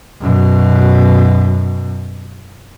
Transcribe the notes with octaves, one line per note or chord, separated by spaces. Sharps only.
F#2 B2